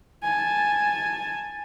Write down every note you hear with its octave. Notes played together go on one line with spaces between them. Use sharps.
G#5 A5